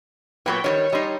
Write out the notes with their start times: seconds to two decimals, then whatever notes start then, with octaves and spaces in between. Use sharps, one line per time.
0.46 A#2 F#3 B3 B4 G5 B5 C#6
0.64 D#3 F#3 G3 C#5
0.92 G3 D#4 D#5 B5 C6